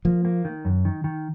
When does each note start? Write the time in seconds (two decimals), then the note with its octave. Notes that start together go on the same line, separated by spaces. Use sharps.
0.05 F3 A#3
0.25 A#3
0.45 D#3
0.65 F#2
0.85 D#3
1.04 D#3